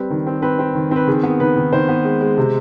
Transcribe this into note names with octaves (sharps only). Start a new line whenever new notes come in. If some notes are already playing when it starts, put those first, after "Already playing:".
Already playing: G3 C4 B4
D#3
C4
C4 B4
C4
D#3
C4 B4
D#3 G#4
B3
D#3 B4
D#3
D#3 C5
B3
G#3
G#3
C3